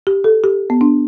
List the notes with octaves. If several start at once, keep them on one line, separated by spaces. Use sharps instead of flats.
G4
A4
G4
B3
D4